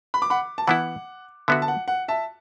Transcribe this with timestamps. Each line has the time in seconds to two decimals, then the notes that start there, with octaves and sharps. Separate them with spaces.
0.14 B5
0.22 D6
0.30 F#5 B5
0.58 A5
0.67 E3 B3 E4 F#5
1.48 D3 B3 F#4 E5
1.62 A5
1.68 F#5
1.88 F#5
2.08 E5 A5